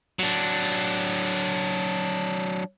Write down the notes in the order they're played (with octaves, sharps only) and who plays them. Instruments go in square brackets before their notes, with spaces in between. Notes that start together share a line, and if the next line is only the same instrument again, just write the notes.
[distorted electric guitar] F#3 D4